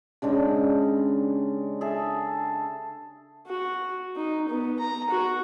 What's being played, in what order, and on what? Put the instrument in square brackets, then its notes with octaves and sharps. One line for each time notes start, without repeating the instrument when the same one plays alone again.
[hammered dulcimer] C#3 G#3 D4 G4
G#4 A4 E5
[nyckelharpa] F#4
D#4
B3
A#5
F#4